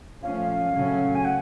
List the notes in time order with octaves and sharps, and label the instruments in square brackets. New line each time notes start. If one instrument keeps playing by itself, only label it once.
[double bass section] F3 A3 C#4 [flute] F5
[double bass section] C#3 F#3 A3 C#4
[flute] G#5
F#5